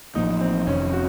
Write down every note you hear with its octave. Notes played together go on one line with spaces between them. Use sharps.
A1 A2 F3 A#3 D#4
C4
F1 F2 C3 D#3 C#4
F#4